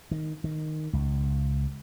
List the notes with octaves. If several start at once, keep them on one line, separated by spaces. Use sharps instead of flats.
D#3
D#3
C#2